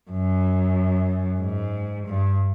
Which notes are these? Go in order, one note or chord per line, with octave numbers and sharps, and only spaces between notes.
F#2
G#2
G2